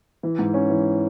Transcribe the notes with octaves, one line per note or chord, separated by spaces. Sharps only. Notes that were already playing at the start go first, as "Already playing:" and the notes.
E3
G#2
C#4
E3